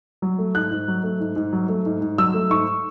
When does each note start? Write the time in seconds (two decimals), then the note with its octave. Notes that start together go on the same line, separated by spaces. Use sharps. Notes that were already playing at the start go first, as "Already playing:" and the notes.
0.22 F#3
0.38 A3
0.55 G#2 F#6
0.71 G#2
0.88 F#3
1.03 A3
1.20 G#2
1.36 G#2
1.53 F#3
1.69 A3
1.86 G#2
2.01 G#2
2.18 F#3 E6
2.34 A3
2.50 G#2 C#6